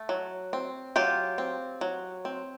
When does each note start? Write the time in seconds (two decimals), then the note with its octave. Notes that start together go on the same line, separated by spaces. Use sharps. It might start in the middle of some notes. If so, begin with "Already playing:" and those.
Already playing: A3
0.09 F#3
0.53 C4
0.96 F#3 F4 G4
1.38 C4
1.81 F#3
2.25 C4